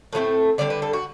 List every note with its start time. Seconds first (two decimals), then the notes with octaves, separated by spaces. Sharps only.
0.13 A2 F#3 A3 C4
0.58 D3 G3 D4 D5
0.70 B4
0.82 A4
0.93 F#4